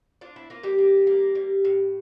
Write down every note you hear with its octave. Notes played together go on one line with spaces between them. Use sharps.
D4 F4
E4
A#3 F4
G3 G4
A#3
A#3
G3
A2